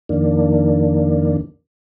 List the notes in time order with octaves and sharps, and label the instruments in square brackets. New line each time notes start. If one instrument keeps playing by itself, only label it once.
[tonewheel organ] F2 D#3 A#3 D4